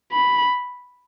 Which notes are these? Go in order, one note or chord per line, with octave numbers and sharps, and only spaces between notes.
B5